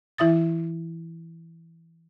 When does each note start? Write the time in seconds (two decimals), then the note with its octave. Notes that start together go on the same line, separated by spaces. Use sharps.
0.18 E3 E4 E5 D#6 A6